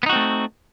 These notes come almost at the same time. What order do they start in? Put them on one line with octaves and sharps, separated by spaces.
B3 D#4 F#4 C4 A3